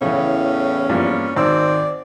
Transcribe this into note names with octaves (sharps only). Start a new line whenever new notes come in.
E2 A2 C#3 E3 C#4
G2 F3 A#3
G#1 D#3 C4 D5 E6